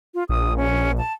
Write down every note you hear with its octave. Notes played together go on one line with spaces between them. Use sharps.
F4
A#1 D#6
C#4
A5